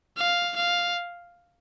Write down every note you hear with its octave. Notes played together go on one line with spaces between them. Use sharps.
F5
F5